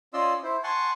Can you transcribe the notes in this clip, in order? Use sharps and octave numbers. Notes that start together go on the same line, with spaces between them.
C#4 F4 D5 D#5 C6 E6
E4 C5
F#5 G#5 A5 C6 C#6